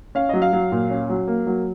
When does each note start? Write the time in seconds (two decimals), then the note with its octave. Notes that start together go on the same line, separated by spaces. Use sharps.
0.15 C#4 F5
0.29 F#3 D#5
0.42 F5
0.53 F#3
0.72 A#2
0.90 C#4
1.10 F#3
1.27 A#3
1.47 F#3